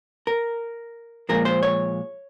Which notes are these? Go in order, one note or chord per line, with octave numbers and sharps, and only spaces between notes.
A#4
A#2 F3 G#3 A#4
C5
C#5